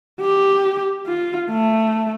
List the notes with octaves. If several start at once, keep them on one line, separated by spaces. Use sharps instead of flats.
G4
F4
A3